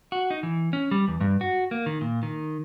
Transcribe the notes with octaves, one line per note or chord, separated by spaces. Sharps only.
F#4
D#4
E3
C#4
G3
E2
G2
F#4
A#3
D#3
A#2
D#3